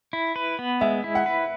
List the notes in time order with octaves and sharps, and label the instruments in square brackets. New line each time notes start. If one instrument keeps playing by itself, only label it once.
[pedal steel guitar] E4
B4
B3
[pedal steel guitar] G#3 [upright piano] E5
[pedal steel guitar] E4
[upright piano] F#5
[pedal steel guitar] B4